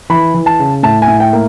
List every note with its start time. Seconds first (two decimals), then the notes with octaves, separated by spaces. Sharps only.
0.10 E3 B5
0.34 E3
0.46 A5
0.59 C#3
0.83 A2 A5
1.02 G#5
1.08 A2
1.20 G5
1.33 A#3